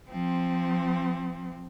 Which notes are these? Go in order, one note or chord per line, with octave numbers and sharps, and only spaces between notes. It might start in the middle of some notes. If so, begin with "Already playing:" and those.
F3 C4